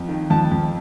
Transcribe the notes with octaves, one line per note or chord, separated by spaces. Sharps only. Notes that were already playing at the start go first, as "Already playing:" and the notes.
Already playing: F2
D#3
F2 A5
F2